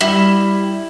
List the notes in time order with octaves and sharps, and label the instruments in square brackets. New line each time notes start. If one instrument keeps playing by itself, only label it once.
[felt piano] G3 [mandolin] E4